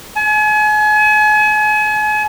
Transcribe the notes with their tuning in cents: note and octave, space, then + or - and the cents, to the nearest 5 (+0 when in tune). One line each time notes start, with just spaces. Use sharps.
G#5 +40